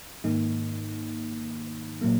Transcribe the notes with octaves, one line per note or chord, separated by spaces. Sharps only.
G#2 D#3 A#3 D#4
A#2 F#3 A#3